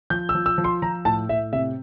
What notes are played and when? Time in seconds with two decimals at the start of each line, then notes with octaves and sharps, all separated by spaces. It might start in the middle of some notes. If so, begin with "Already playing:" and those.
0.10 F3 G6
0.29 E6
0.35 F3
0.46 E6
0.58 F3
0.64 C6
0.82 F3 A#5
1.05 A2 A5
1.29 A2 E5
1.53 C3 E5